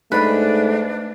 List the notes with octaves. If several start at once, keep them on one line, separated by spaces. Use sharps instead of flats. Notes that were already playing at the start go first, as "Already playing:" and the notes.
G#2 A3 D4 B4